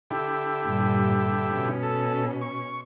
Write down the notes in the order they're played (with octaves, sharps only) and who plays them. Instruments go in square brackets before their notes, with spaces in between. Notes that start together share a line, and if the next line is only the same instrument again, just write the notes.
[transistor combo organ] D3 E4 G4
[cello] G2 A#2
B2 C#4
[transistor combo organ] A4
C#6